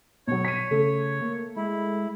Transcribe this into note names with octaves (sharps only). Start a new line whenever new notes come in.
B2 F#3 C#5
B6 D#7
C#3 A3
A#3
G#3 E4